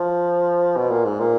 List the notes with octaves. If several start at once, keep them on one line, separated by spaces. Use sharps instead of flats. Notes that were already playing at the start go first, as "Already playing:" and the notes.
Already playing: F3
B2
A#2
G#2
A#2